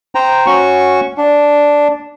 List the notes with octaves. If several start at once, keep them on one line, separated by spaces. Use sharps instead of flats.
C5 G5 A#5
C#4 F#4 C#6
D4